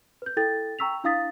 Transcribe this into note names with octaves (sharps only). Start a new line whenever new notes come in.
B4 G6
E4 A4 G5 A6
G5 A#5 C#6 E6 B6 F7
D4 E4 F5 D#6 A6 B6